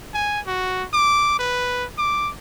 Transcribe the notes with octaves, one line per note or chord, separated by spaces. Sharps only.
G#5
F#4
D6
B4
D6